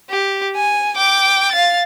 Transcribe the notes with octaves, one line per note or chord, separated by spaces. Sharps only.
G4
G#5
G5 D6
F5 A6